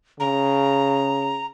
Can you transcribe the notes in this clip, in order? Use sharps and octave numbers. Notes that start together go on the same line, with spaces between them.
C#3 A#5